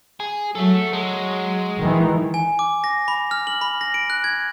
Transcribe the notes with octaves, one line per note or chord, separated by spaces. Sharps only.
G#4
F#3 A3 A4
G#3
D#3 E3
G#5
D6
A#6
B5
F6
F#7
B5
A#6
D7
F#6
G#6